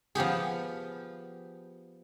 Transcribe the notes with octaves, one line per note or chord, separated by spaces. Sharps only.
F3 B3 G4 G#4